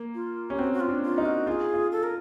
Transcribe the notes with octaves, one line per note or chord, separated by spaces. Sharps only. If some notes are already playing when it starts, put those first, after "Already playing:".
Already playing: A#3
F4
C#4 G4
C4 F#4
F#4
F4
D4
F4
D#4
F#4
F4 G#4
F4
A4
A#4